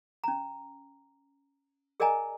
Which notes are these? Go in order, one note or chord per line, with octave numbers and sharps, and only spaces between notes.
C#4 A#5
G#4 A#4 D5 D#5 G#5 A#5